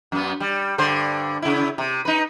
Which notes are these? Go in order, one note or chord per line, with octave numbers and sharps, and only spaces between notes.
F#2 B3
G3
G2 D3 C5
C#3 E4
C3
D#4 B4